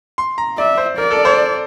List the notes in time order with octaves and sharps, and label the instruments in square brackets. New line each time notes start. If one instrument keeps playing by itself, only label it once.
[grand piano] C6
A#5
[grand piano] D5 [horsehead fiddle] E5
[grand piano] C5
[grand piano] A#4 [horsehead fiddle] D5
[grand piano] A4
C5